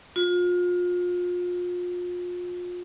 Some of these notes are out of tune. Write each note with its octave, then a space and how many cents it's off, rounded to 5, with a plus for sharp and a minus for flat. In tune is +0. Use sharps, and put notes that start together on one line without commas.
F4 +30